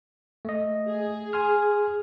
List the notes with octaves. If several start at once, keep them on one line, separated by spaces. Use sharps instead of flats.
A3 D#5
G#4
G#5 C6 F6